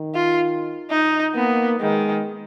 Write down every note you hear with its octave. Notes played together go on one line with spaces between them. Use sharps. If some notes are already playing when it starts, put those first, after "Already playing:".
Already playing: D#3
F4
D#4
A#3 B3
D#3 G#3